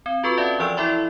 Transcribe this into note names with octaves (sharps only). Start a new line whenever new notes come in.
C4
F4 F#4 A4 B4 C#6
C#4 D5 E5 F5 A5
E3 F3 D5 E6 D7 F7
E4 A4 D5 E5 B5 C6